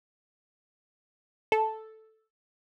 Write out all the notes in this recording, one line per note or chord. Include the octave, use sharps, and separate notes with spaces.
A4